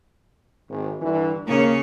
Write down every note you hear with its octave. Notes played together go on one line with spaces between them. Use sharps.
G#1
G2 D3 E3
D#2 C#3 A#3 C#4 C#5